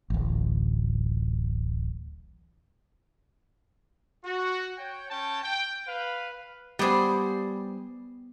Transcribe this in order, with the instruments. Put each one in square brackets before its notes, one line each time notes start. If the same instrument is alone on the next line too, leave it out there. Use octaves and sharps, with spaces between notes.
[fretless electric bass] D1 A1
[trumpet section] F#4
C#5 G5
C#4 C#5 G5 A5
G5
B4 F5
[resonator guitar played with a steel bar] G3 C5 [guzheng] B3 G#4